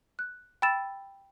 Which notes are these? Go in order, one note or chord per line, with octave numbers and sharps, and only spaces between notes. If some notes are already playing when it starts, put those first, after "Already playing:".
F#6
G5 B5 E6 A6 E7